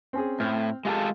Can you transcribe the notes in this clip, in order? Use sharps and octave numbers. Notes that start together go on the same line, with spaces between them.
C4 C#4 G#4
A2 C4 F6
G#3 F4 G4 A4 F5